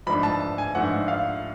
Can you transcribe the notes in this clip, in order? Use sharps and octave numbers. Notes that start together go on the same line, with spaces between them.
G#2 F3 A3 D4 B5
A5
A5
G#5
G#2 F3 A3 D4 F#5
F5